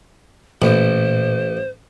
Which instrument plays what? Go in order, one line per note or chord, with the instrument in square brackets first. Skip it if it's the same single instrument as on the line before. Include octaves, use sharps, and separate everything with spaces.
[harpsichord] A1 [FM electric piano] A#2 [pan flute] C5